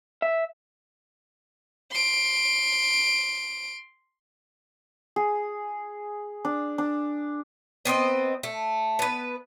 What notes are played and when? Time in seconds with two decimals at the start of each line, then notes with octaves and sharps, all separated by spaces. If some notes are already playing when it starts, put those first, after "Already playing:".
0.22 E5
1.92 C6 D7
5.16 G#4
6.45 D4
6.78 D4
7.85 B3 C4 C5 D#5
8.43 A3
8.99 B3 B4